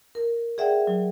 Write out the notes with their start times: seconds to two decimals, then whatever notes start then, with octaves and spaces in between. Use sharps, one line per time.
0.15 A#4
0.58 G#4 D5 E5 F#5 G5
0.87 F#3